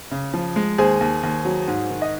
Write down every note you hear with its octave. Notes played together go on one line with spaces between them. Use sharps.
C#3
F3
G#3
D#2 G#4 C5
D#2
D#2
F#3
G#2
D#3
D#5